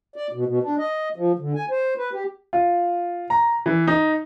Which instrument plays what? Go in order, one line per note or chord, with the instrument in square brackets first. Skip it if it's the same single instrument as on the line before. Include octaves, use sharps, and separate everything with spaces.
[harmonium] D5
B2
B2
D4
D#5
F3
D3
G#5
C5
B4
G4
[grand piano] F4
A#5
E3
D#4